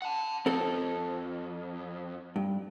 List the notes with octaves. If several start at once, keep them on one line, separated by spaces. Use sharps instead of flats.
F#5 A5
F2 C4 A4
G2